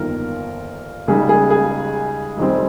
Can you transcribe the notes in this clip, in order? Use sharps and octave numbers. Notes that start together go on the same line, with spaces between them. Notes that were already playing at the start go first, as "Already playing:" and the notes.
Already playing: G1 F2 D#3 A#3 F4 A#4
C#2 C#3 G3 A#3 D#4 G#4
G#4
G#4
F1 F2 D#3 G3 C4